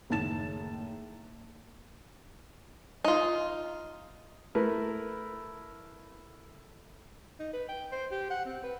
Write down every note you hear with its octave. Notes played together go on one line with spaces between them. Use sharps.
F#1 A2 D#3 A5 A6 E7
D#4 F4
A3 E4 A#4 B4
D#4
B4
G5
C5
G4
F#5
C4
B4